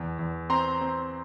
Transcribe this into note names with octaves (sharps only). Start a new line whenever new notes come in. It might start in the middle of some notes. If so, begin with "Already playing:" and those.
Already playing: E2
E2
C4 A#5 C6
C4